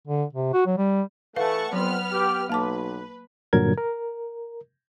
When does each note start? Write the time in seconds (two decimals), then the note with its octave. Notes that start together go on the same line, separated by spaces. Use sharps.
0.07 D3
0.33 C3
0.54 F#4
0.66 F#3
0.78 G3
1.36 E3 A3 B4 F5 F#5 A5 C#6
1.73 F2 F#3 B3 C4 B4 C5 F6
2.12 G4
2.50 B1 A#3 B4 A5 D6
3.53 G2 A#2 D3 F#3 A#4 G#6
3.78 A#4